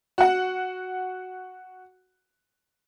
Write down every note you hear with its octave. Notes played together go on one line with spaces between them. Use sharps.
F#4 F#5